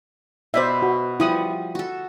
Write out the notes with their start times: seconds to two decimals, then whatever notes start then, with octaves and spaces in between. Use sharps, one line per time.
0.54 B2 B4 C5 D5 E5 B5
0.82 F#4
1.20 F3 G3 E4 F#5 D#6
1.75 F#4 A4